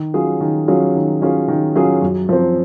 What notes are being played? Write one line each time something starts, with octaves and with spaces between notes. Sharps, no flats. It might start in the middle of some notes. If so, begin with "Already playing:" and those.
Already playing: D#3
F#3 C#4 F4 G#4
D#3
F#3 C#4 F4 G#4
D#3
F#3 C#4 F4 G#4
D#3
F#3 C#4 F4 G#4
F#2
F3 C4